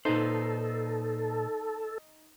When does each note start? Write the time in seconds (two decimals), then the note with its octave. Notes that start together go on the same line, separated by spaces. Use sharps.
0.05 A#2 D#4 A4 B4 C5